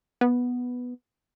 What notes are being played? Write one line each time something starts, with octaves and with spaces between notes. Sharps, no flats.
B3